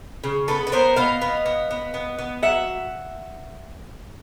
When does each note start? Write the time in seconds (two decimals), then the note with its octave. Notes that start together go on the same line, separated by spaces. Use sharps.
0.24 C#3
0.48 B3 A4 B4
0.67 B4
0.72 B3 A#4 C5
0.96 B3 D#5 F5
1.22 B3
1.46 B3
1.71 B3
1.94 B3
2.18 B3
2.43 F#3 E5 F#5